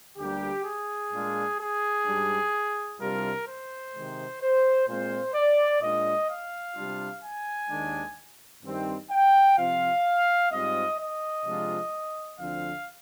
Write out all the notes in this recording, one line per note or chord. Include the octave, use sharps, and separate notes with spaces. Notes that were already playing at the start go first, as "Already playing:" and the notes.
D2 D3 G3 A#3 G4
G#4
A#2 G#3 D4 F4
G#4
G#2 G3 D4
C2 C3 G3 D4 F4 A#4
C5
C3 D#3 G#3
C5
A#2 G#3 C4 F4 C5
D5
A#2 G#3 D4 F4 D#5
F5
C3 G3 D4 F4
G#5
D#2 D#3 G#3 D4
G2 D#3 G3 C4 D#4
G5
C3 F3 C4 F4 F5
G#2 G3 C4 F4 D#5
D#5
C3 F3 G#3 D4 F4
D2 D3 F3 C4 F5